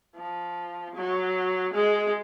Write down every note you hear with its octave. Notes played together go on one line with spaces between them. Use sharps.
F3
F#3
G#3